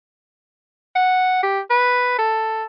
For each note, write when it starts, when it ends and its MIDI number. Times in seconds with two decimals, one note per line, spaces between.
0.95 1.40 78
1.43 1.60 67
1.70 2.18 71
2.18 2.64 69